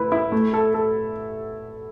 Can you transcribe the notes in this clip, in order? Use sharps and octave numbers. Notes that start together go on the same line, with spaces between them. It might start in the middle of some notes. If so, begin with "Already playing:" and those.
Already playing: A3 E4 B4
E4
A3
A4
A4